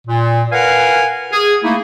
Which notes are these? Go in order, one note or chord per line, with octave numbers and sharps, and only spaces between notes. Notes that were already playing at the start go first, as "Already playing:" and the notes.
A#2
A#4 B4 F5 F#5 G#5
G#4
A3 A#3 D#4 E4